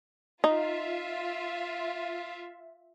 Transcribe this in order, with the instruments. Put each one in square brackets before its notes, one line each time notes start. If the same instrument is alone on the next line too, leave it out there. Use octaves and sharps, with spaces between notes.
[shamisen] D#4 [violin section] F4 E5